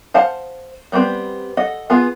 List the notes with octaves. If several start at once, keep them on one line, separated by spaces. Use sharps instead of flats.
C5 F5 F#5 A5
G3 A3 B3 C4 B4
A4 D#5 F#5
B3 F4 G#4 G#5